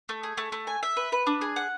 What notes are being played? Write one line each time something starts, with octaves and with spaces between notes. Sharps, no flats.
A3
G#4
A3
A3
G#5
E5
B4
B4
D4
G#4
F#5